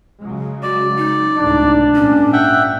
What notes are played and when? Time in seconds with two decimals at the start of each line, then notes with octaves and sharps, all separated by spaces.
0.21 C#3 F#3 G#3
0.63 F#4 D5
0.97 D#4
1.37 C#2 A2 C3 D4
1.95 A#1 G#2 A#3 C#4
2.33 E5 F#5 G5